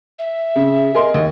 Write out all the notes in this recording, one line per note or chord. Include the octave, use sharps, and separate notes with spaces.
E5
C#3 G#4
G#4 A#4 D#5 C6
D#2